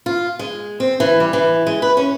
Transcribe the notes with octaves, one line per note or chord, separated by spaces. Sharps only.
F4
G#3
C4
E3
G3
E3
G#3
B4
C#4